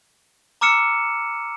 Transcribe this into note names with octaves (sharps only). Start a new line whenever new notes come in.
A#5 D6 E6 F6 C#7 E7